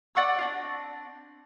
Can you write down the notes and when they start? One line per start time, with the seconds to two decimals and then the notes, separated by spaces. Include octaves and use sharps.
0.15 D5 F#5 C#6 E6
0.38 C4 D4 F4